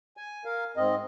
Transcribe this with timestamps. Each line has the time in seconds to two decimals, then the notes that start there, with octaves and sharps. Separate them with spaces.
0.17 G#5
0.45 A#4 F5
0.77 G#2 C4 D#5